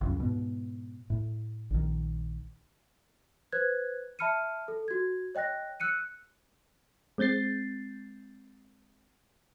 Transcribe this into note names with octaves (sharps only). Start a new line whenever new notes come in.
C#2 F#2 C#3
G#2 B2
A2
A#1 D#3
B4 C5 F#6 G#6
E5 A5 B5 F6 C#7 D#7
A4
F#4 G#6
C#5 D#5 G5 F#6 A#6
E6 F#6 C#7 D#7
G#3 C4 G6 A6 C7